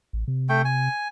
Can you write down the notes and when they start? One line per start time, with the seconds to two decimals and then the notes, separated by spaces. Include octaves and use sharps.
0.13 A1
0.28 C3
0.49 A3 G5
0.65 G#5